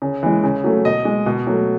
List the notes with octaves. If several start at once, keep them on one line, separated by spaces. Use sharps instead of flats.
C#3
E3 G#3
C#3
F#3 A3
B2 D#5
G#3
B2
F#3 A3